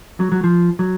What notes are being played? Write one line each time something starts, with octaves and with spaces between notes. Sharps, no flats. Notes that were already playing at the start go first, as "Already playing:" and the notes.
F#3
F#3
F3
F#3